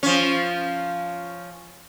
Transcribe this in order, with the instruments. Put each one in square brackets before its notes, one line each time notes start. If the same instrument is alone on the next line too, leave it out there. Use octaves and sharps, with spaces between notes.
[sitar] F3 C#4